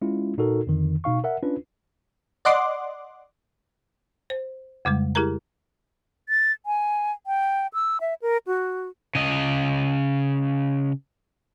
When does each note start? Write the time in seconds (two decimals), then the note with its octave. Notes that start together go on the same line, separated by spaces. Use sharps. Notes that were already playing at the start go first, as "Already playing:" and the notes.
0.02 G#3 C#4 E4 F4
0.37 A#2 D#4 F#4 A4 A#4
0.67 F2 D3 D#3
1.04 B2 D#4 F5 C#6
1.24 A#4 E5 F#5
1.42 C#4 D4 F4 B4
2.45 D5 D#5 F#5 C6 D6
4.30 C5
4.85 F2 C#3 G3 G#3
5.15 E4 G4 G#4 A#4 A#5
6.29 A6
6.66 G#5
7.27 G5
7.74 E6
8.01 E5
8.22 A#4
8.47 F#4
9.15 C#3 D#5